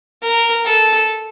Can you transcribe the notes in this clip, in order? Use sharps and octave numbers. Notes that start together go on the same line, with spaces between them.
A#4
A4